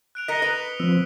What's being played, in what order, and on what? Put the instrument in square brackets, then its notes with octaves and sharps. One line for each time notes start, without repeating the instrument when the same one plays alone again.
[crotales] F#6 D7 F7
[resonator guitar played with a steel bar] A#4 D#5 [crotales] B6 C#7 G7
[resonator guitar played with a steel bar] B4 [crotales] D#6 D#7 F7
[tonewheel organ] F3 C4 [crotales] E6